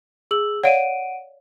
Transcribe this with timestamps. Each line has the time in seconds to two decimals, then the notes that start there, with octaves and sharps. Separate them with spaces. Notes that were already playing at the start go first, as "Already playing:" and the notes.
0.31 G#4 E6 F#7
0.64 C#5 D5 F5 F#5 D7 D#7